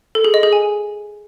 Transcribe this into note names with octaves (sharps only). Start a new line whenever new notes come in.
A4
G#4
D#5
G#4
G#5